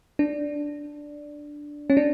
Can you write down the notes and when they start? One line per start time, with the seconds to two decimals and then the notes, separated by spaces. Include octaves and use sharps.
0.19 D4
1.90 C#4
1.97 D4